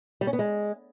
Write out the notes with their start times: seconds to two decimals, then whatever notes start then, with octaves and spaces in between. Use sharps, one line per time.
0.21 G3
0.27 C#4
0.33 B3
0.39 G#3